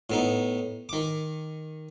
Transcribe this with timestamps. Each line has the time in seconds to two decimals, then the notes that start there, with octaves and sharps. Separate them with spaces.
0.10 A2 B3 D#4
0.89 D#3 D6